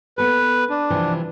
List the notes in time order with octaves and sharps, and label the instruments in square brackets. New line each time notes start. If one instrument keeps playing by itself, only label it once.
[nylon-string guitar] B3 A4 [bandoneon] B4
[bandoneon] D4
[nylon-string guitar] C3 E3 F3